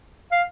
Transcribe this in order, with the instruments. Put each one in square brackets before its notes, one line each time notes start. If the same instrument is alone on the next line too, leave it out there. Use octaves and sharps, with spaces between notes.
[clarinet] F5